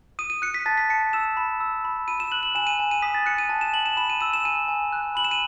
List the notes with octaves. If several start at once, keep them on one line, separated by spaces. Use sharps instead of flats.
D#6 D#7
D#7
F#6 C#7
B6
A5 A6
B6
A5 C#7
E6 E7
B5
E6
B5
B5 D#7
E7
F#6 F#7
F#7
G#5 E7
D#7
G#5
D#7
D#6 B6
A6
F#6 C#7
D#7
A5
E7
A5 F#7
E7
B5 E7
D#7
E6 D#7
E7
G#5 D#7
G#5
F#6
B5 F#7
E7
D#7